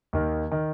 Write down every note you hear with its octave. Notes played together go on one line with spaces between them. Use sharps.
D#2 D#3
D#3